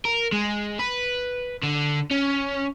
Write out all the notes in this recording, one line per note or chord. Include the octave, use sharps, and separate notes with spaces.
A#4
G#3
B4
D3
C#4